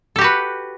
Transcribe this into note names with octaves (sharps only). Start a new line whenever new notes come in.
F#4 G4 A4 B4